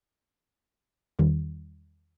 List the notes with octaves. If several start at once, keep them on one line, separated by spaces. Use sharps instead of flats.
E2 D#3 G3